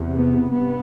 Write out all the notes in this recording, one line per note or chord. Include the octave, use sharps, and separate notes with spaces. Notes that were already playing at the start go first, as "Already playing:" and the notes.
Already playing: E2 C3
B3
G2 B3